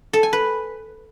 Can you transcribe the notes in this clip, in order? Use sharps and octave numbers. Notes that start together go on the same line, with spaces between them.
A4
G#5
B4